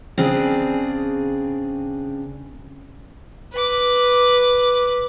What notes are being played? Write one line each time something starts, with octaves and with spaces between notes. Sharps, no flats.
C#3 C4 D4 G#4
B4 D6